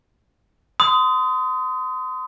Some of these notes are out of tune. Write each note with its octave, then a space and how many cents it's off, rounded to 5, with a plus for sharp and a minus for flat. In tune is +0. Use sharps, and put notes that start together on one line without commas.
C6 -30 D#6 +10